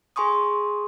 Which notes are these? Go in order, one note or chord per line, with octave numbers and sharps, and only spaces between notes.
G#4 G#5 C6 C#6 D#6